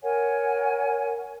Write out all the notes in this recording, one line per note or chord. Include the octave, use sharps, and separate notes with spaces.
A#4 C#5 F#5 G#5